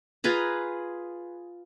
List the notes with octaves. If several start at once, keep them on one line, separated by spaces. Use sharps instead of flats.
F4 G#4 B4 A#5